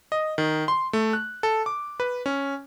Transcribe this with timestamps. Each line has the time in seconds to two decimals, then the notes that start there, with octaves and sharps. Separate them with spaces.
0.12 D#5
0.38 D#3
0.68 C6
0.93 A3
1.13 F#6
1.43 A4
1.66 D6
2.00 B4
2.26 C#4